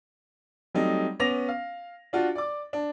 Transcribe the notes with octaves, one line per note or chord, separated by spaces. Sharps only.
F#3 G3 A3 C4 D#4
B3 C#4 D6 A#6 F7
F5
D4 F4 F#4
D5 D6
D4